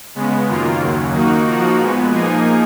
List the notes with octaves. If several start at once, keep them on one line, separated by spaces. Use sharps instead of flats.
C#3 G#3 B3
F#2 D#3 A#3 F4
D#2 C#3 F#3
D#3 A#3 D#4 F#4
F3 A#3 D#4 F#4
A#2 G#3 B3
F3 A#3 D#4 G#4